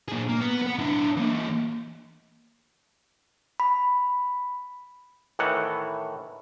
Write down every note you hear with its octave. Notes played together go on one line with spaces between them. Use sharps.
A#2 G#4
A#3
B3
B3 F#5
D4 E4
E3 A#3
B5
A2 D#3 E3 F#5